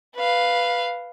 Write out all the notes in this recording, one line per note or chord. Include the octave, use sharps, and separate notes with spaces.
B4 F5